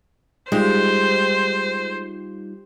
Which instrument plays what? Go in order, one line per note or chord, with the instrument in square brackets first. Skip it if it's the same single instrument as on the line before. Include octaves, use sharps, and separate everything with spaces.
[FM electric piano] G3 D#4 F4 [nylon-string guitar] G#3 [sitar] G4 [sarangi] C5